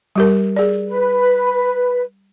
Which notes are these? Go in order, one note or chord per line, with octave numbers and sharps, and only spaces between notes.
G3 G4 A#4
G#4 D5
B4